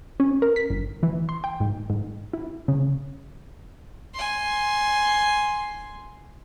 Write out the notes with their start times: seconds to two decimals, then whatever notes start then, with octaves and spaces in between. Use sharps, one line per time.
0.20 C#4
0.42 A#4
0.56 B6
0.70 G1
1.03 E3
1.29 C6
1.44 G5
1.60 G#2
1.90 G#2
2.33 E4
2.68 C#3
4.14 G#5 C6